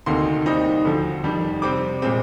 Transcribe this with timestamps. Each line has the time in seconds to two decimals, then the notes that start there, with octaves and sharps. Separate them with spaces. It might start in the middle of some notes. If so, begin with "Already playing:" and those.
0.06 D2 C3 D#3 A#3 D#4 C6
0.46 D#2 D#3 G3 C4 D#4
0.85 D2 D3 F3
1.23 F2 D#3 G3 D4
1.62 C3 G3 C4 D6
2.02 A#2 G#3 C4